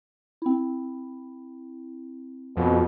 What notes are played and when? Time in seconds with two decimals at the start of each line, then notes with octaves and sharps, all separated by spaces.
0.42 C4 E4
2.57 F2 B2